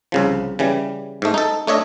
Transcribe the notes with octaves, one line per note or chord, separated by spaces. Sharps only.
C2 C#3 F3
C#3 E3 G3
G#2 A3
D#4 A4
A3 D4 C#5 D#5 E5